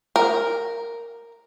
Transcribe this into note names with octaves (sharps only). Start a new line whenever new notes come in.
A#4